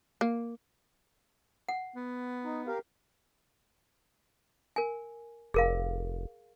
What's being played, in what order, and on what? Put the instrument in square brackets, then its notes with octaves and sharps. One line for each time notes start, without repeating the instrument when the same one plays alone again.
[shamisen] A#3
[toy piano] F#5
[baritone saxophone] B3
[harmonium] D#4
G4 A#4 F5
[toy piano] A#4 G#5
[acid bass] F1 [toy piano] G#4 A#4 F5